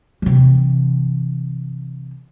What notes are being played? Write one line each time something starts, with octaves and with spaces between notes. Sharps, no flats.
C3 E3